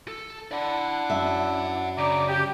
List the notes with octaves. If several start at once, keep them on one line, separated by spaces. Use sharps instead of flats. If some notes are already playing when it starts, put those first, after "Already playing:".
A4
D4 E4 D5 F#5
F#2 E5
C#3 D4 A#5 D6
G4